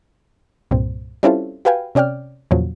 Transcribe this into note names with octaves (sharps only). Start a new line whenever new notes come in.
C2 G2 A#2 C4
G3 C4 C#4 E4 F4 A4
F#4 G4 B4 F5 G5 G#5
C3 C#4 D5 G5 F6
E2 A#2 C#3 F3 F#3